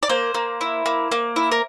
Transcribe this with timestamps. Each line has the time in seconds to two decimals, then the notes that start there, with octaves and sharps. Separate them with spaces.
0.03 D5
0.09 A#3 C5
0.34 A#3
0.61 E4
0.86 A#3
1.11 A#3
1.36 E4
1.52 A#4